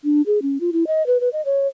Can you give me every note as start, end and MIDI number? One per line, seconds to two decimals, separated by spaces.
0.04 0.22 62
0.27 0.42 68
0.42 0.58 61
0.61 0.70 65
0.73 0.87 64
0.87 1.05 75
1.07 1.20 71
1.20 1.29 71
1.33 1.41 75
1.46 1.67 73